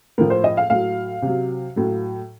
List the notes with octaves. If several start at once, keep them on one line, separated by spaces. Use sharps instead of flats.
A2 F3 A#4
C5
D#5
F5
A2 F#3 F5
C3 F#3
A2 F#3